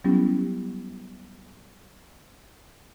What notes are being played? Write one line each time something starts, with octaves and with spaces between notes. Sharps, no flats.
F#3 G3 B3 C#4 E4 G4